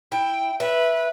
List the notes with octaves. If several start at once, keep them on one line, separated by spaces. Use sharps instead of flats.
E4 G5
B4 E5